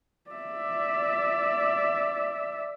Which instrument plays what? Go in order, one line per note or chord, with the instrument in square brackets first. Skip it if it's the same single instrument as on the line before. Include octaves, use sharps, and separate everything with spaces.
[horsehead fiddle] D5 E5